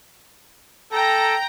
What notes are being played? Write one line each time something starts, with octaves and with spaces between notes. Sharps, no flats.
A4 G5 A#5